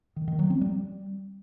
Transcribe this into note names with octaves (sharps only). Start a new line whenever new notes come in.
D#3
D#3
F#3
C4
G3